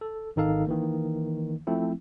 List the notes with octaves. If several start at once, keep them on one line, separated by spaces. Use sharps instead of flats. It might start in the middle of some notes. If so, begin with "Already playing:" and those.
A4
G#1 D#3 D#4 A4 F5
D#3 E3 A#3
F3 A3 C4 E4